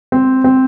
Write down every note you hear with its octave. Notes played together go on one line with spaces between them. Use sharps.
C4
C4